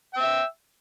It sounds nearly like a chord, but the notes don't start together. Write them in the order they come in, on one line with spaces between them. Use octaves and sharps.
G5 E6 E5